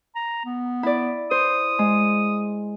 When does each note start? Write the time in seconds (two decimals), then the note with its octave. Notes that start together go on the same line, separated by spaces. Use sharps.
0.16 A#5
0.46 B3
0.83 E4 D5
1.31 C5 D#6
1.79 G#3